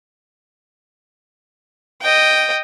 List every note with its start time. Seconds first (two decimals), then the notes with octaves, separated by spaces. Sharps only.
2.01 D#5 G5